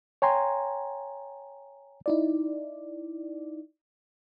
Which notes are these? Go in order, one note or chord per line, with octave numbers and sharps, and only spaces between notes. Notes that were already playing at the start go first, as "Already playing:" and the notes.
C#5 G5 G#5 A#5 C6
D#4 E4 D5